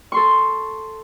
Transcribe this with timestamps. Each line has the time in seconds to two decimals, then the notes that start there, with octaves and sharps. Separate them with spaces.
0.12 A4 C6 C#6